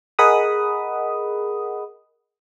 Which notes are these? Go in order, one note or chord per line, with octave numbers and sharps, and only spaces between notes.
G#4 A#4 D#5 F#5 B5 D#6